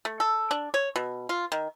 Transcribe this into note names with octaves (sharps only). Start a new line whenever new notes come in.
A3
A4
D4
C#5
B2
F4
D#3